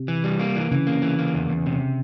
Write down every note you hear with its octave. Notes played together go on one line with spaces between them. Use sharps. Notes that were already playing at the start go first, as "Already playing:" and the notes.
Already playing: C3
E3
G3
A#3
E3
C#3 E3
A#3
E3
A#3
E2
E2
C3